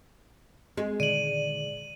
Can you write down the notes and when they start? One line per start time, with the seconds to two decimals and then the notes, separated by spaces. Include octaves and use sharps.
0.77 G#3 C4
1.00 A#2 D3 D#3 D5 D#7 F#7